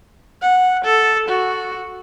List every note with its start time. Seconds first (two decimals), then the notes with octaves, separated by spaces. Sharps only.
0.42 F#5
0.84 A4
1.29 F#4